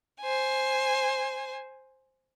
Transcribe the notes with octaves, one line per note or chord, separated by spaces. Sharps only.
C5 G#5